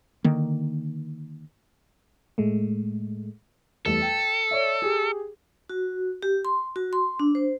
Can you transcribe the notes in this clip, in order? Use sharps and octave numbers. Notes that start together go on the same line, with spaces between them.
D3 D#3 A#3
A2 G#3 A3
E2 G3 A3 A4
G5
C#5 D5 E5
G4 G#4
F#4
G4
C6
F#4
C6
D4
C5